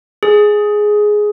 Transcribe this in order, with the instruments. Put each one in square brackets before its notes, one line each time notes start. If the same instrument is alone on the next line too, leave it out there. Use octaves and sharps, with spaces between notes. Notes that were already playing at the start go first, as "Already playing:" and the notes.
[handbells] G#4